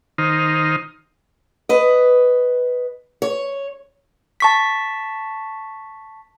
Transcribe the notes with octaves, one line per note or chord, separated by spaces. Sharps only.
D#3 D#4 C5 F6
B4 D#5
C#5
A5 C#6 B6